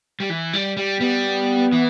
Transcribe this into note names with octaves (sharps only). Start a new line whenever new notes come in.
G3
E3
G3
G3
G3 B3
E3